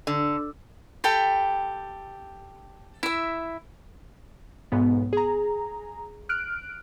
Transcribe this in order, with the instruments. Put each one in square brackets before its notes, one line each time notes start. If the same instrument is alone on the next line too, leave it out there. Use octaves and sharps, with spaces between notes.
[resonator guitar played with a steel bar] D3
[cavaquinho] G4 A4 G5 B5
E4 E5
[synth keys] B1 G#2 B3
G#4 A#5
F6 F#6 D7